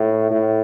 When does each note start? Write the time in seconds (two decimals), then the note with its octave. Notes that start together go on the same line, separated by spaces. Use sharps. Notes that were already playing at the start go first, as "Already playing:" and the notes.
Already playing: A2
0.31 A2